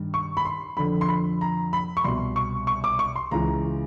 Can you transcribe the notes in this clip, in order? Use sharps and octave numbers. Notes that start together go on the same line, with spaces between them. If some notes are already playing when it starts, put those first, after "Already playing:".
Already playing: G2 D#3
C#6
B5
C6
F2 D3 B5
C6
B5
A#5
B5
C#6
C2 B2 C6
C#6
C#6
D6
C#6
C6
C#2 C#3 E3 A#5